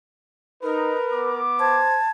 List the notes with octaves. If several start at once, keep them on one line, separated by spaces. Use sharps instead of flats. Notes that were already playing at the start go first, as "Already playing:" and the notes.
D#4 A#4 B4
B3 D6
C5 A5 G#6